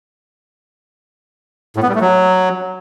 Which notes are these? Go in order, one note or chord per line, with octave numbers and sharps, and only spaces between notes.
A2
B3
G3
A3
F#3